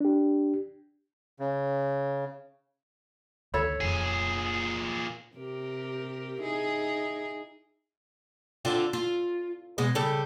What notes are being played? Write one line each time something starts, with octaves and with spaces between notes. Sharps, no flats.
D4 G4
C#3
D2 D3 D#3 A4 C#5 B5
D#1 F2 A#2 G#4
C3 G4 A#4
D#4 E4 G#4
D3 C4 F4
F4
B2 G#3
C#3 G3 A4